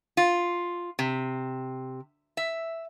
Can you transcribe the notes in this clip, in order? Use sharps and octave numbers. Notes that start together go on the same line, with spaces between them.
F4
C3
E5